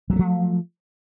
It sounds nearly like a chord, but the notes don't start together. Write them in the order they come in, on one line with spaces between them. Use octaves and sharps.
F#3 G#3 A3 F3